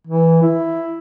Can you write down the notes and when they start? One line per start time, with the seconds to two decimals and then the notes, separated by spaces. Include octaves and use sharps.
0.07 E3
0.42 E4